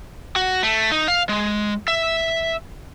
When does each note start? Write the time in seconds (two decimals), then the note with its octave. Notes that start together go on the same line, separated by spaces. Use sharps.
0.36 F#4
0.63 A3
0.92 D#4
1.08 F5
1.29 G#3
1.88 E5